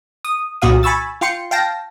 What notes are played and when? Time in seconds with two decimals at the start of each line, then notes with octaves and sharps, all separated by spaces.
0.25 D#6
0.62 C2 A#2 F#4 F5 D#6
0.83 G#5 B5 C#6 E6 A6
1.21 F4 G5 C6 C#7
1.51 F5 G5 A5 A#6